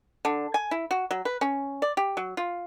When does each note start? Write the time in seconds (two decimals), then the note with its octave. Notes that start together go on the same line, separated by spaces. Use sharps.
0.25 D3
0.54 G#5
0.71 E4
0.91 F#4
1.11 F#3
1.25 B4
1.41 C#4
1.82 D5
1.97 G4
2.17 F#3
2.37 F4